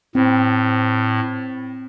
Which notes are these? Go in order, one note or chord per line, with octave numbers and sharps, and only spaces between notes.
A2 C4